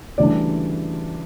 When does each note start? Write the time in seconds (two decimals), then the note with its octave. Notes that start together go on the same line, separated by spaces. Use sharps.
0.18 D2 C#3 E3 G3 D4 D5